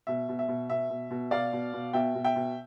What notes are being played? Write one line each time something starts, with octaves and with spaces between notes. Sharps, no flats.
B2 E5
B2
E5
B2
B2 E5
B2
B2
B2 D5 F5
B2
B2
B2 E5 G5
B2
E5 G5
B2